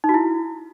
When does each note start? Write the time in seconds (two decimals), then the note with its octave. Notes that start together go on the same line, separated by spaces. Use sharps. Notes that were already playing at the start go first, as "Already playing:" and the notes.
0.04 D#4
0.09 F#4
0.14 E4